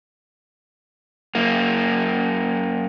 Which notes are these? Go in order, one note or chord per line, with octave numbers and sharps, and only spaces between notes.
F#2 A#3